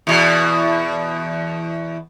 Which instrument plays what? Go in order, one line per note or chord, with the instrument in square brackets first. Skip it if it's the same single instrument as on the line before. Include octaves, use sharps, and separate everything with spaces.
[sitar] E2 B2